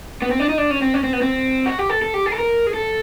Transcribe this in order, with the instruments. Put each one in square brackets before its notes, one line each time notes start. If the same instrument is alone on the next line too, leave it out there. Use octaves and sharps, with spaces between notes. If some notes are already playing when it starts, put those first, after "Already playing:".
[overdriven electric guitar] B3
C4
D4
D#4
D4
C#4
C4
C#4
C4
B3
C4
F#4
G4
A4
A4
G4
G#4
A4
A#4
G#4
A4